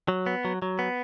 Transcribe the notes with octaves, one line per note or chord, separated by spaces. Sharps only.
F#3
B3
F#3
F#3
B3